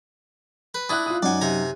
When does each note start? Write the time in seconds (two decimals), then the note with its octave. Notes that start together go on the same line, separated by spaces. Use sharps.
0.74 B4
0.89 D4 E4 D#6 F#6
1.06 F4 D#6
1.23 F#2 D#4 D5 F#5 G#5
1.41 C3 G#5 A#5